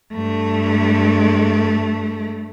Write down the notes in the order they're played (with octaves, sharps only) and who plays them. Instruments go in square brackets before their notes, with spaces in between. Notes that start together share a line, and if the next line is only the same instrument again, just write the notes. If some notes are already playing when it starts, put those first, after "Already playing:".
[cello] G2 A3